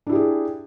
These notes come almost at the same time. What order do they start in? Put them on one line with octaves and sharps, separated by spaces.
D4 E4 G4 G#4